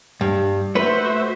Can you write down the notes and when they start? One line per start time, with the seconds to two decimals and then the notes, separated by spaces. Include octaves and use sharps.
0.21 G2
0.75 A3 F#4 B4 C5 E5